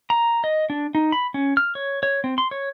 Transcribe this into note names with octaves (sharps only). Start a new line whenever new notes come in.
A#5
D#5
D4
D#4
B5
C#4
F6
C#5
C#5
C4
C6
C#5